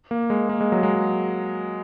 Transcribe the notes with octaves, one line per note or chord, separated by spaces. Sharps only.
A#3
G#3
A#3
G#3
F#3
G#3